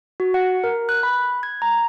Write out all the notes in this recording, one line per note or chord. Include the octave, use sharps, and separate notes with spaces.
F#4
F#5
A#4
F#6
B5
G#6
A#5